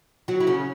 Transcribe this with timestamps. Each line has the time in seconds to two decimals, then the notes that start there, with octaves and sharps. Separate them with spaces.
0.28 F#3 F#4
0.40 E4
0.47 C#3 C#4